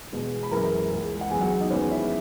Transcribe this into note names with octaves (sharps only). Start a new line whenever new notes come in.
E2 B2 G#3
B5
F#2 E3 G#3 A#4 A#5
C#2 C#3 G#3
F#5
E2 C#3 F#3 G#4 G#5
F#4 F#5
D#4 D#5
E2 D#3 G#3 B3 C#4 C#5
E4 E5